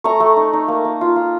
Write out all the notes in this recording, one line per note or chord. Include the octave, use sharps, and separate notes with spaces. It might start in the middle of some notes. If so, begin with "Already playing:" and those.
A3 A#5 C#6
A3
D#4
D#4
A#3
A#3
F4
F4